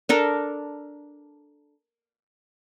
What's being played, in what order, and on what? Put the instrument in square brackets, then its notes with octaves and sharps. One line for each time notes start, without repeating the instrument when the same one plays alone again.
[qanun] D4 A4 A#4